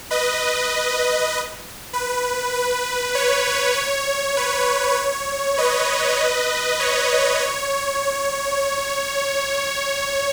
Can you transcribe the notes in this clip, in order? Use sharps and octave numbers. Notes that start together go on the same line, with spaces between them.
B4 D#5
B4
B4
C#5
B4
C#5
B4
C#5
B4 D#5
C#5
C#5